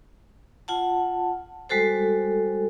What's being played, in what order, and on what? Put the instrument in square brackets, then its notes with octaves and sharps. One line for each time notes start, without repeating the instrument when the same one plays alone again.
[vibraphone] F4 F#5 A5
G3 G#3 F#4 A4 C5